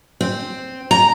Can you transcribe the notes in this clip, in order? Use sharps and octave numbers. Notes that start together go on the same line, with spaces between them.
C4
A#5